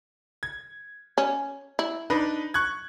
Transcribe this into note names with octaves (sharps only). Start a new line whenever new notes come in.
G#6
C#4
E4
D4 D#4 B4
C#6 F#6 G#6